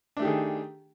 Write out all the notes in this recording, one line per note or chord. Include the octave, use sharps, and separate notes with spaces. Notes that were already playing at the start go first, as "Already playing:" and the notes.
D#3 A3 D4 G4 G#4